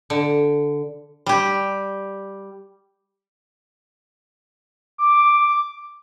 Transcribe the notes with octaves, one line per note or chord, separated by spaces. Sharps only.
D3
G3 G4
D6